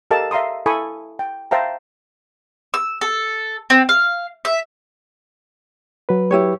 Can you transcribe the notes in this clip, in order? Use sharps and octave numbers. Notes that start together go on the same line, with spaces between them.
G4 A4 A#4 D#5 F5 A5
E5 F5 A#5 C6 D#6
E4 A4 G#5 B5 C#6 D#6
G5
C5 E5 F5 G5 A5 A#5
E6
A4
C4
F5
E5
F#3 B4
E4 G4 C#5